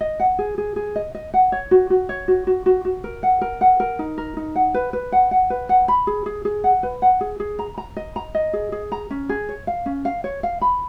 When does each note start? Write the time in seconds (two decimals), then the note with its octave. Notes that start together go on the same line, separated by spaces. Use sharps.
0.01 D#5
0.20 F#5
0.39 G#4
0.58 G#4
0.76 G#4
0.96 D#5
1.15 D#5
1.34 F#5
1.52 C#5
1.71 F#4
1.90 F#4
2.09 C#5
2.28 F#4
2.47 F#4
2.66 F#4
2.85 F#4
3.04 A#4
3.23 F#5
3.41 A#4
3.61 F#5
3.80 A#4
3.99 D#4
4.18 A#4
4.37 D#4
4.56 F#5
4.74 B4
4.93 B4
5.12 F#5
5.31 F#5
5.50 B4
5.69 F#5
5.88 B5
6.07 G#4
6.26 G#4
6.45 G#4
6.64 F#5
6.83 B4
7.02 F#5
7.21 G#4
7.40 G#4
7.59 A#5
7.78 A#5
7.97 D#5
8.16 A#5
8.35 D#5
8.53 G#4
8.72 G#4
8.92 A#5
9.11 C#4
9.29 G#4
9.49 C#5
9.67 F5
9.86 C#4
10.05 F5
10.24 C#5
10.43 F5
10.61 B5